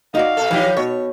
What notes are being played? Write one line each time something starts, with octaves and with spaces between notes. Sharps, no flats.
D#4 F#4 D5 F5
B2 A4
E3 F3 G3 D#4 G4
B2 C#5